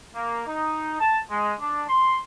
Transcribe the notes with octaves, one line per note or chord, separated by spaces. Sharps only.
A#3
D#4
A5
G#3
D4
C6